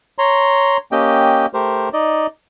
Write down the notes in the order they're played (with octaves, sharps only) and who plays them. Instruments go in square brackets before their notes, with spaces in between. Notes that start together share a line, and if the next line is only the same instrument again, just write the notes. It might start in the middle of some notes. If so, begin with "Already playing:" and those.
[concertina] C#5 A#5 C6
A#3 C#4 G4 D#5 G5
A3 G4 A#4 C5
D#4 D5 D#5